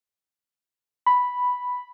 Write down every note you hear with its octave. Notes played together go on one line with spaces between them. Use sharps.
B5